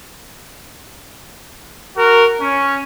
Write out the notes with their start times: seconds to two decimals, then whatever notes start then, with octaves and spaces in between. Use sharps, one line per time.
1.97 F#4 A#4
2.40 C#4